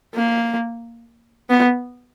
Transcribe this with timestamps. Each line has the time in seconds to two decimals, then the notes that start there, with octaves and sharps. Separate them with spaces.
0.15 A#3
1.50 B3